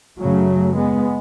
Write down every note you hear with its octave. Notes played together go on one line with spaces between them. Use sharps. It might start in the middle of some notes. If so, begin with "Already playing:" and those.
F#2 C#3 F#3 A3
G#3 B3